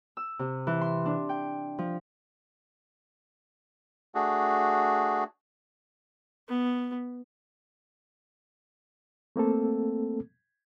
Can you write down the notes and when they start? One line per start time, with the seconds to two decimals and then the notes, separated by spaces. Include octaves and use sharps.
0.17 E6
0.39 C3
0.67 E3
0.81 C6
1.05 D4
1.29 G5
1.78 F3
4.15 A3 D4 F#4 G#4
6.49 B3
9.36 A3 A#3 C4 A4